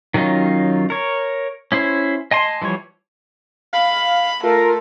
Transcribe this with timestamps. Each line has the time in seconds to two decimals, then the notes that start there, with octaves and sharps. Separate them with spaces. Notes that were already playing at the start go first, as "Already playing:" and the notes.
0.14 D#3 F#3 C#4 D#4 F4
0.90 A#4 C#5
1.72 C#4 E4 C5
2.31 D#5 G#5 A5 C6
2.62 E3 F3 G3 C#5
3.73 F5 B5
4.43 A3 F4 A#4